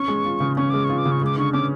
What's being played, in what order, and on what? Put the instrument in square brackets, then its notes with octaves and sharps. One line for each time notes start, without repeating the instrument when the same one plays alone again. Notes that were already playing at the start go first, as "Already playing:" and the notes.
Already playing: [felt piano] C#4 [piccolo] C#6
[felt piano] G#3
F4
C#3
[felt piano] C#4 [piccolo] C#6
[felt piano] G#3 [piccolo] D6
[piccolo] C#6
[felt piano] F4
[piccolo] D6
[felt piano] C#3
[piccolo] C#6
[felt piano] G#3 [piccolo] D6
[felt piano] D3 [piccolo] C#6
[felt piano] C#4 [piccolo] D6